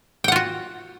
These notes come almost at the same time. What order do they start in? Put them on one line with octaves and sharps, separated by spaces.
G5 F#5 F4 F#4